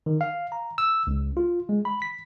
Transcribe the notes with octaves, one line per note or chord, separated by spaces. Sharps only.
D#3
F5
A#5
E6
C#2
F4
G#3
B5
B6